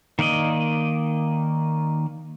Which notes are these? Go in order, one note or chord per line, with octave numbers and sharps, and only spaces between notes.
D#3 A#3 D5 D#5